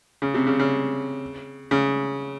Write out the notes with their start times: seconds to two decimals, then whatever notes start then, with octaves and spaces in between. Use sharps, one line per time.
0.22 C#3
0.34 C3
0.47 C#3
0.59 C#3
1.71 C#3